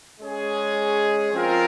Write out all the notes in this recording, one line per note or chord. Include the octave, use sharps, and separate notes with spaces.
G#3 C#4 G#4
F3 C4 F4 A#4